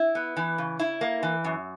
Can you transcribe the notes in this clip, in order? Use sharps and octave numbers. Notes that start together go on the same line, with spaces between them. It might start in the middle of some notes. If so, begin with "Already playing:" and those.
Already playing: E4
B3
E3
C#3
E4
A#3
E3
F#2